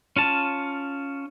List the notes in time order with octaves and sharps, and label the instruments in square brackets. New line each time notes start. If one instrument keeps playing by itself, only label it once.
[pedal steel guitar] C#4 F4 A5